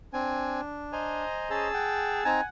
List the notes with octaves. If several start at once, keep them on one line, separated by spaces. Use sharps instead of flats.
C4 D4 G#5
C5 D#5 G#5 A#5
C#4 G#4 A5 E6
F#5 G5
C4 D#4 G#5 A#5